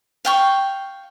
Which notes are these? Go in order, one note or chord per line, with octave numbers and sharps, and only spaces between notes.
F5 G5 C#6